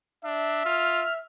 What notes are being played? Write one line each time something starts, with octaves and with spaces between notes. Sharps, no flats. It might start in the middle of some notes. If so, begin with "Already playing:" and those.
D4 E5
F4 F6